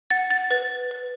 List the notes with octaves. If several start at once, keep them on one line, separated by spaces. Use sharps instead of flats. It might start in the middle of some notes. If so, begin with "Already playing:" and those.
F#5 A6
A6
B4 A6
B4